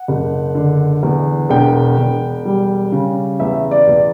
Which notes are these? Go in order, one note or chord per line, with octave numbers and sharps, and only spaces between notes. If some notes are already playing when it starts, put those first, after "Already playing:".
Already playing: F#5
F#1
D3
E2
E1 G5
E1
G3
C#3
E2 E5
D5
E2